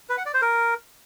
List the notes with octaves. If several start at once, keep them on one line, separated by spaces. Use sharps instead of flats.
B4
F#5
D5
C5
A#4